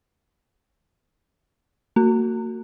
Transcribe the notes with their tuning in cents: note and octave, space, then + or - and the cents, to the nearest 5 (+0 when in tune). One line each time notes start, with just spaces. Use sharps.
A#3 -35 F#4 +0